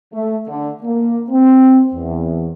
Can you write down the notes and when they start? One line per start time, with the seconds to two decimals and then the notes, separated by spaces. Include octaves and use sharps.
0.13 A3
0.47 D3
0.83 A#3
1.30 C4
1.94 E2